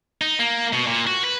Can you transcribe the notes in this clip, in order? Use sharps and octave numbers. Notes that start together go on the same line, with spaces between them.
D#4
A#3
B2
A#2
F#4
B4